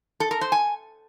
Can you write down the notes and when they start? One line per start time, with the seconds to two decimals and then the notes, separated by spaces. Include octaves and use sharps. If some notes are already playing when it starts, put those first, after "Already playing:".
0.20 A4
0.31 A#4
0.41 C5
0.52 G#5